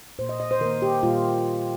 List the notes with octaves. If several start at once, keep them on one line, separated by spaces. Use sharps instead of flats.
A#2 A#3 C5
D#5
D#5
C5
D#3 A#3 A#4
G4
A#2 G3 A#3 F4